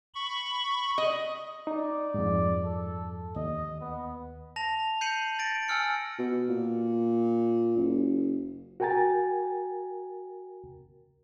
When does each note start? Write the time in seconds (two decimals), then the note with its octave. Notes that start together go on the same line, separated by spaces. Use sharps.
0.15 B5 C#6
0.98 D#5
1.67 D#4 D5
2.14 F2 G#2
2.64 A4
3.36 D#2 D#5
3.81 B3
4.56 A5 A#6 F7
5.01 G6 C7 C#7 D#7 F#7
5.39 A6 A#6 D7
5.68 G#5 E6 F6 C#7
6.19 B2
6.49 A#2
7.77 F#1
8.80 F#4 A#4 G5 G#5 A#5 A6